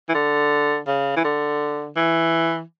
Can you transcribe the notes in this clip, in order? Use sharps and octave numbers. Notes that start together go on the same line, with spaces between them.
E3
D3
C#3
E3
D3
E3